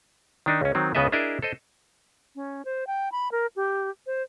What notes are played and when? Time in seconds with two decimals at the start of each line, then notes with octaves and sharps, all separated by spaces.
0.46 D#3 D4 D#4
0.61 C#2 C#4
0.75 D#3 F#3 C4
0.95 C#2 C#3 B3 B4 D#5 E5
1.12 D4 E4 G#4 A#4 D#5 E5
1.42 A4 C5 D#5
2.35 C#4
2.65 C5
2.87 G5
3.12 B5
3.32 A#4
3.56 G4
4.06 C5